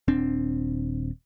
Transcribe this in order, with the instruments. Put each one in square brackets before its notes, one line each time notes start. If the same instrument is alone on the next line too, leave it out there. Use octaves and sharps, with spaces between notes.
[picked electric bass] D#1 C4 D4